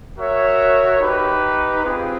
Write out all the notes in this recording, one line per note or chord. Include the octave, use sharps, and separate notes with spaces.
F#4 A#4 C#5 E5
D#4 G4 B4
C4 F4 G#4